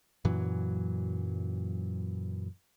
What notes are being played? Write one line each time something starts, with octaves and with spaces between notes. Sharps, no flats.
F#2 A#2 E3 F#3